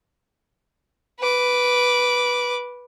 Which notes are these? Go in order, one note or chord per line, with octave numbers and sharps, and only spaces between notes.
B4 D6